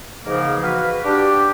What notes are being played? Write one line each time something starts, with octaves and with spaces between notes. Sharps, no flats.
G#2 C#3 E3 F3 A#3
F#4 B4 F5
D4 G4